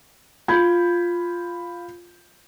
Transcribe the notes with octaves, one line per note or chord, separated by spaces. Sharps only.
F4 B5 G6 G#6